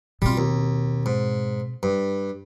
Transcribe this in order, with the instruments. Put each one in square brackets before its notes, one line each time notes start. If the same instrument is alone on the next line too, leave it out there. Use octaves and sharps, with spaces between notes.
[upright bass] B2 C4 [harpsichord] G3 F4
[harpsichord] D#2
G#2
G2